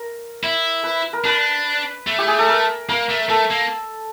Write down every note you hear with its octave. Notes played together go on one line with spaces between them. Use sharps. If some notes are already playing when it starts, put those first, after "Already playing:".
Already playing: A#4
E4
B4
A#4
D4 B4
A3
G4
G#4
A4
A#4
A#3 A#4
A3
A3 A4
A#3